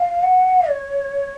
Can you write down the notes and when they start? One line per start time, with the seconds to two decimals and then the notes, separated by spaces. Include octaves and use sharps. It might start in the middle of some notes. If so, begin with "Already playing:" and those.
Already playing: F5
0.23 F#5
0.69 C#5